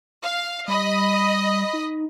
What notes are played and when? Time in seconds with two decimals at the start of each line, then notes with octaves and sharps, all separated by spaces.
0.23 F5
0.68 G3 D#5 B5 D#6
1.73 D#4